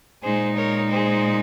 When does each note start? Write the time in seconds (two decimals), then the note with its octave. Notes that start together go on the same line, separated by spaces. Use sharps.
0.23 A#2 G#3 D#4 G#4 C5
0.56 A#4 C#5
0.90 G#4 C5